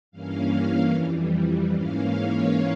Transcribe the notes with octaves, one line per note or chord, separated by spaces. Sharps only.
G2 E3 A#3 C#4 F5
F2 E3 G3
G#2 E3 A#3 C#4 F5
C#5